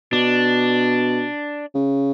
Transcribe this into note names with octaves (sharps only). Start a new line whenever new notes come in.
B2 D4
C#3